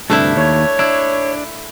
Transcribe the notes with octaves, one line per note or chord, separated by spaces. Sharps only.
D2 G2 C3 A3 D4 E4
D#2 C#5
D4 E4